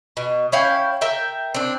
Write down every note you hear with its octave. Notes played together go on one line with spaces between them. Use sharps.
B2
C#4 E4 F5 G5
A#4 E5 G5
C4 D4